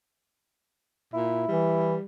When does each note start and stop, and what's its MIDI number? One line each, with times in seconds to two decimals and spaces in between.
1.13 1.47 46
1.13 1.95 64
1.48 1.96 52
1.48 2.05 55